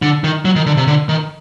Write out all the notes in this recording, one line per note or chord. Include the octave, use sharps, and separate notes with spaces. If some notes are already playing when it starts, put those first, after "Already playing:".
D3
D#3
F#3
D#3
D3
C3
D3
D#3